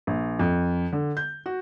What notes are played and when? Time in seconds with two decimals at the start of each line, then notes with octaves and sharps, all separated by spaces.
0.07 A#1
0.40 F2
0.93 D3
1.17 G6
1.46 F#4